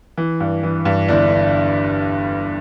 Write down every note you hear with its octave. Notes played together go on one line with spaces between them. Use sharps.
E3
G2
E3
G2
G1 D4 E4